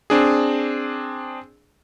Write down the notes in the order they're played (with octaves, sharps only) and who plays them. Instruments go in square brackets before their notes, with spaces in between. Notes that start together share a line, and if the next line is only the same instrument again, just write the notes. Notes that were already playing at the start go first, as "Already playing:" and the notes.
[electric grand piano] C4 D4 G#4